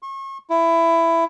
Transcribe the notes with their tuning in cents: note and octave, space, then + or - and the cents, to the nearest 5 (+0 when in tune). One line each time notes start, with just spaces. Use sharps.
C#6 -35
E4 +15